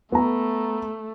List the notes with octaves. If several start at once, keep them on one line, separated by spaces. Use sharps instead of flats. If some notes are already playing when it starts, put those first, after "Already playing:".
A3 B3 A#5